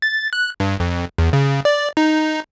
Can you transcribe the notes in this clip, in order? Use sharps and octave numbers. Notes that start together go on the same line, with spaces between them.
A6
F#6
G2
F2
E2
C#3
D5
D#4